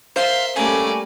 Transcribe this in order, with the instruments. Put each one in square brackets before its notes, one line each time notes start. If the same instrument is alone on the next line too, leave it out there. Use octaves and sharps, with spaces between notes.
[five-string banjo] A#4 C5 [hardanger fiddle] E5 C6 [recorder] F5
[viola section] G3 A3 C#4 [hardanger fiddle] A#3 D5 [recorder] G#5